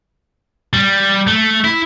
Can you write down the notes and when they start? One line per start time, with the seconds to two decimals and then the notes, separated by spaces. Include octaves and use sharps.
0.73 G3
1.27 A3
1.65 E4